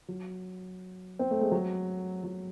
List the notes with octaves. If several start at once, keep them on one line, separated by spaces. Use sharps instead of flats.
F#3
C4
A3
G#3
F#3
F#3